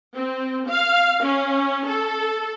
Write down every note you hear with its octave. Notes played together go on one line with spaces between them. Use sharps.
C4
F5
C#4
A4